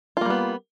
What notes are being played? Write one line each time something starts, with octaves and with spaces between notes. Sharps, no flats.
G3 A#3 B3 F4